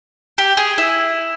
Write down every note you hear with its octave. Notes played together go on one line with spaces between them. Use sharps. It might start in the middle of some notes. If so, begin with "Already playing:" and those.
G4
G#4
E4